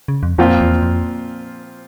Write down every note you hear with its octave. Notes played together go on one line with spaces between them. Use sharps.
C#3
F2
F2 A#2 F3 C4 F4
E2
F2